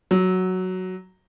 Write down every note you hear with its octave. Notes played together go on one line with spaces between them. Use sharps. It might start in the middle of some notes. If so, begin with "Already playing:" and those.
F#3